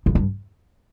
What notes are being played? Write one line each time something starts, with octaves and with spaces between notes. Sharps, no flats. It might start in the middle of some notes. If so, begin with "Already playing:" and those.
F2
G2